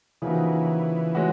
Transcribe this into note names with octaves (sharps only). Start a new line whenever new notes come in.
C#3 E3 F3 A#3 D#4 F#4
G#3 C#4 F#4